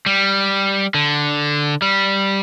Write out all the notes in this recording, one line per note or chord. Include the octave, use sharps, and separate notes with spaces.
G3
D3
G3